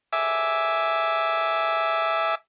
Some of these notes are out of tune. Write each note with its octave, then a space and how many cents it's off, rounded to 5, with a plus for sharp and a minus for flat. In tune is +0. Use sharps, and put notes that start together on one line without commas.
E5 +0 G#5 +0 D6 +0